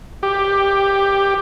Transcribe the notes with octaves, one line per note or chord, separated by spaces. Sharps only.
G4